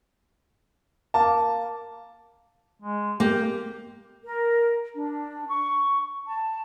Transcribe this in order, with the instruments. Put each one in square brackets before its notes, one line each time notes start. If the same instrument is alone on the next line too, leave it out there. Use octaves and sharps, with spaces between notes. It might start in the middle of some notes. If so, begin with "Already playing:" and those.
[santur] A#3 [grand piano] A5
[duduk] G#3
[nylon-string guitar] A#3 [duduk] G4
[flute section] A#4
D4
C#6
A5